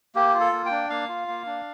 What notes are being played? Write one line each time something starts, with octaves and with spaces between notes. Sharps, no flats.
A#3 G4
F4
A4
A#3
G5
D4
A#3 F5
F4
A#3
D4